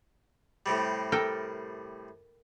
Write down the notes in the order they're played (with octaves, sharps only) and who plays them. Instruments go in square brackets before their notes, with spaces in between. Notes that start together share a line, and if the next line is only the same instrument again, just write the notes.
[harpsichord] A2 C3 G3
[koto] A4 A#4 G5